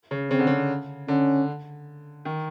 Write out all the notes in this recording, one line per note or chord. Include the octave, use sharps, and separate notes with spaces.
C#3
C#3 C4
D3
C#3
D3 C#4
D#3